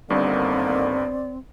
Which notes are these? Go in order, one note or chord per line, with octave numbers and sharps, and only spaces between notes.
G1 G2 D3 D#3 A#3 C4 D5